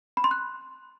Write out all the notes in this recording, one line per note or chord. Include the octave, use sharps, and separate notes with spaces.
B5
C6
F#6